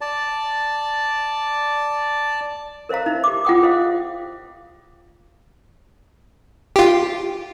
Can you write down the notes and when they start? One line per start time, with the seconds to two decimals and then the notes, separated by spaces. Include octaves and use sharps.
0.01 D5 A5
2.89 A#4 C5 D#5 F5 A#5
3.06 D#4 E5
3.24 G4 D6
3.45 F4 G#4 F#5 G5 D6 D#6
3.62 G#4 C5 D#5 F5
6.76 F4 G4